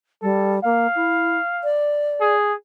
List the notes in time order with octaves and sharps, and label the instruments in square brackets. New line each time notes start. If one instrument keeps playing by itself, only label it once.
[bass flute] G3 [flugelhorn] A4
[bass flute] A#3 [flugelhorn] F5
[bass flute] E4
D5
[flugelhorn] G#4